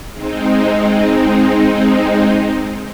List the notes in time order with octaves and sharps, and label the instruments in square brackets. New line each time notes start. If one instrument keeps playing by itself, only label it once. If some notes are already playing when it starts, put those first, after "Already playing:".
[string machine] G#3 C4 D#4